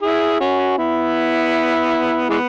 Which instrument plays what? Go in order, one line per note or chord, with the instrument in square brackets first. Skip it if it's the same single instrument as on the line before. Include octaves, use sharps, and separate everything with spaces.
[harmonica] E4 G#4
C#4 F#4
B3 E4
E3 G#3 B3